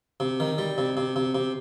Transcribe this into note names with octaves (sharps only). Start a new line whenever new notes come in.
C3
D#3
G3
C3
C3
C3
C3